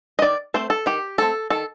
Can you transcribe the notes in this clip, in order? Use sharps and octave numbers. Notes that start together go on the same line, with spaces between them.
D#5
D#3 D5
A3 C4 C5
A4
D#3 G4
A3 C4 A4
D#3 A4